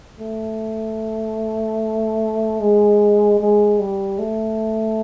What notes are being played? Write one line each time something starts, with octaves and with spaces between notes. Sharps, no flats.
A3
G#3
G#3
G3
A3